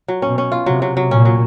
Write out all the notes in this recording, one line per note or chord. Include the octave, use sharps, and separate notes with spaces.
F#3
B2 C#4
C#4
F4
C3 F#3
F#3
F#3
A#2 C#4
F#3